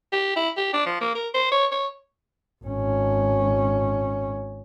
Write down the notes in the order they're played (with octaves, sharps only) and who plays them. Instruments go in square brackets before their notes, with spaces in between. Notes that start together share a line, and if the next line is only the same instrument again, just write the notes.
[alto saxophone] G4
E4
G4
D4
F3
A#3
A#4
C5
C#5
C#5
[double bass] G#1 C#4